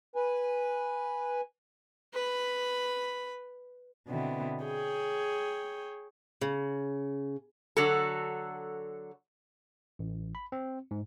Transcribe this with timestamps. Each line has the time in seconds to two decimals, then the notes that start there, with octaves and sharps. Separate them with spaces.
0.16 B4 G#5
2.13 B4 B5
4.07 B2 D3 B3 C4 E4
4.65 G#4 C#5 G5
6.41 C#3
7.77 D3 F#3 F#4 A4
9.99 A1
10.35 B5
10.52 C4
10.91 G#2